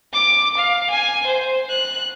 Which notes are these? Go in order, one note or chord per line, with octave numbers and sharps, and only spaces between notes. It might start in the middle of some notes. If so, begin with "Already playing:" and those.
D6
F5
G#5
C5
F#6